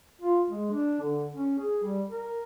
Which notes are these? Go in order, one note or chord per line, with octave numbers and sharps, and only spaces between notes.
F4
G#3
D4
D3
C#4
G#4
G3
A#4